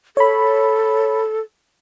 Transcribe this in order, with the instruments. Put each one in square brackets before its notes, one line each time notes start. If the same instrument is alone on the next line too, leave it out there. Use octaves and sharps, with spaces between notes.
[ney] A4 [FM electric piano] C#5 B5